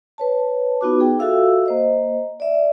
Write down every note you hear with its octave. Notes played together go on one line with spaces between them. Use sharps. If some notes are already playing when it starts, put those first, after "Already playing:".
B4 C#5 A5
B3 D#4 F4 F#4 B4 D6
G#4 G5
F4 F#4 A4 E5 F5 E6
A#3 C5 D#5
D5 E5